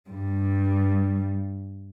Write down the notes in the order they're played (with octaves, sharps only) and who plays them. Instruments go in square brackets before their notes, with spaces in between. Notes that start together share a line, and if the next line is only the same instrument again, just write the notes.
[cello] G2 G3